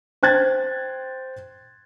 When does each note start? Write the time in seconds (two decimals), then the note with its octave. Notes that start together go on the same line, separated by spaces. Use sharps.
0.23 C5 G5 F#6 G#6 A6